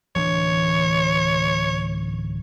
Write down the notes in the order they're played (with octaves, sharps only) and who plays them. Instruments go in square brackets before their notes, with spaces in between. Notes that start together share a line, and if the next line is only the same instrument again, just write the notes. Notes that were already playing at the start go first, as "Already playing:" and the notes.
[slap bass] D1 E3 D4 [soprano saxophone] C#5